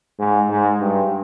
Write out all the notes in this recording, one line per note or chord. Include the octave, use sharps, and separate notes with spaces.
G#2
G#2
G2